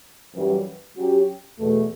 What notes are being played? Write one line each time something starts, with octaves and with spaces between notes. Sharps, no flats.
F#2 E3 G3
F#3 C#4 G4
E2 B2 A3